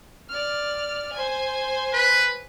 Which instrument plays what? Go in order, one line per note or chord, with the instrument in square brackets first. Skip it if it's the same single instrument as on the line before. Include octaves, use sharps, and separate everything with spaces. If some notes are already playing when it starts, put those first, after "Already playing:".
[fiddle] D5 F6
C5 G#5
[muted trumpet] B4